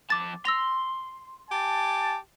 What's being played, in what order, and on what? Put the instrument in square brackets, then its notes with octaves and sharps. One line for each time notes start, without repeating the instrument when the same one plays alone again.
[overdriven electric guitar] F2 A5 [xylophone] D6 A6
[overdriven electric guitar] C6 [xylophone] E6 A#6 F7
[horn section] G4 G#5 A5